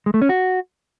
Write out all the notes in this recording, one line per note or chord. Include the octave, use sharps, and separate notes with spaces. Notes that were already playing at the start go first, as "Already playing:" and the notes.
G#3
A3
C#4
F#4